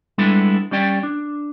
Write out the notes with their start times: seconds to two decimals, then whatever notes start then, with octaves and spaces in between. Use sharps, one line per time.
0.18 G3 G#3 B3 D4 E4 A4
0.71 G3 C#4 D5 G5
1.03 D4